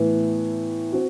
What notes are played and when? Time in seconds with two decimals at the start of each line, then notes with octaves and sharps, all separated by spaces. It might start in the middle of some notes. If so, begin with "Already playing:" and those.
Already playing: A2 E3 B3
0.92 C4 F#4